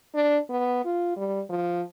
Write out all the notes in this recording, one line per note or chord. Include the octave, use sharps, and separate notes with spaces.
D4
B3
F4
G3
F3